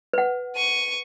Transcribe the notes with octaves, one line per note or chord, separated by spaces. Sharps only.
B4 F#5
C#6 D#7